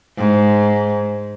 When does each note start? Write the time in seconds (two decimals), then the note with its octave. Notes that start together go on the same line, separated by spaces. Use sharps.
0.18 G#2